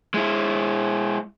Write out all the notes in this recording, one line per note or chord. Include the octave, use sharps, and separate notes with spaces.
G#3 E4